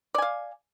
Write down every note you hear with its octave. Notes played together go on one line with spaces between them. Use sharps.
D5 F5 G#5